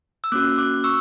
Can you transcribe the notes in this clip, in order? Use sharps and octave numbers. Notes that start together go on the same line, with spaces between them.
E6
A#3 C#4 F#4 D6 F#6
D6 F#6
C#6 E6